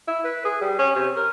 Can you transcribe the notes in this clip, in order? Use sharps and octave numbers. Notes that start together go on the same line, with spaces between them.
E4
B4
G#4
G3
C#4
C3
A#4